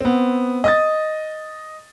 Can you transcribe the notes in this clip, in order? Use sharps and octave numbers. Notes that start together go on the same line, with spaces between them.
B3 C4
D#5 D#6 A6